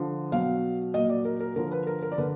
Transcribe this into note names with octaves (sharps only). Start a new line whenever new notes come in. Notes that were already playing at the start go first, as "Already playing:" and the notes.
Already playing: D3 F3
B2 F#3 F5
A#2 F#3 D#5
D5
A#4
A#4
D3 F3 A#4
B4
A#4
A#4
D5
D3 B4